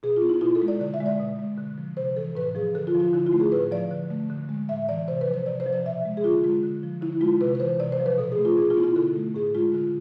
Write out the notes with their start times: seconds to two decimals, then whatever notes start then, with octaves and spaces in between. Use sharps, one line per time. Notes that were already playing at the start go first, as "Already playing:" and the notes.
0.03 B2 G#4
0.17 F4
0.22 B3
0.29 E4
0.41 B2 F4
0.55 A4
0.62 G#3
0.68 D5
0.80 D3 D5
0.94 E5
1.01 G#3
1.06 D5
1.20 B2
1.39 G#3
1.58 D3
1.78 F3
1.97 C3 C5
2.16 E3 A4
2.35 A2 B4
2.55 F3 G#4
2.75 D3 A4
2.87 F4
2.95 F3
3.00 F4
3.13 D3 E4
3.27 F4
3.33 A3
3.40 G#4
3.52 A2 B4
3.72 F3 D5
3.91 D3
4.10 A3
4.30 D3
4.49 G#3
4.69 A2 E5
4.89 E3 D5
5.08 C3 C5
5.21 B4
5.27 F3
5.34 C5
5.46 C3 D5
5.60 C5
5.66 F3
5.73 D5
5.86 B2 E5
6.05 G#3
6.17 G#4
6.24 D3 F4
6.44 G#3 F4
6.63 D3
6.83 F3
7.01 D3 E4
7.21 G#3 F4
7.41 C3 B4
7.55 B4
7.60 E3 C5
7.80 C3 D5
7.92 C5
8.00 F3
8.06 B4
8.18 B2 A4
8.32 G#4
8.37 A3
8.45 F4
8.57 B2 G#4
8.70 F4
8.77 B3 E4
8.84 F4
8.96 D3 A4
9.16 A3
9.34 A2 G#4
9.55 G#3 F4
9.73 D3 F4